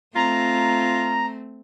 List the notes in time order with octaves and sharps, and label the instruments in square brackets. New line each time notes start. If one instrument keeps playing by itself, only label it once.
[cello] A3 C4 [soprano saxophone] F4 [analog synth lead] A#5